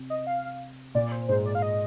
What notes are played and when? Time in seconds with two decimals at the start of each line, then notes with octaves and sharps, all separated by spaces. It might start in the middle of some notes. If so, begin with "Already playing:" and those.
Already playing: C3
0.10 D#5
0.27 F5
0.95 A#2 D5
1.05 D5
1.12 C5
1.28 G#2 C5
1.46 D5
1.55 F5
1.62 D#5